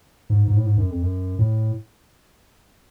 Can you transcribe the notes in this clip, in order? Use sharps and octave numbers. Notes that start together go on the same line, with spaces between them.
G#2
G#2
A2
G#2
F#2
F2
F#2
A2